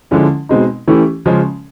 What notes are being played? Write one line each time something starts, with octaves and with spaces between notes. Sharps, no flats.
D3 F3 G#3 C#4 E4
B2 G#3 C4 D#4
E3 A3 C#4 E4 G4
C#3 F3 G#3 C#4